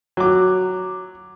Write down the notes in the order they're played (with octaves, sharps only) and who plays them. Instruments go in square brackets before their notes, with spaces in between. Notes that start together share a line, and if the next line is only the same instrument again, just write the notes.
[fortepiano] F#3 D6